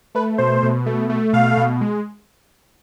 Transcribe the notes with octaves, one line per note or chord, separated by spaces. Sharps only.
A3 B4
B2 C5
B2
A3
A3
B2 F5
B2
G#3